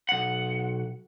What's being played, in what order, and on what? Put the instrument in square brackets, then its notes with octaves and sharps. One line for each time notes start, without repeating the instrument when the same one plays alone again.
[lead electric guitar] B1 F#5